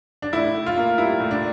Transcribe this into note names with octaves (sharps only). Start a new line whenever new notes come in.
D4
A2 E4
A2
F4
A#3
G3 E4
A2
D4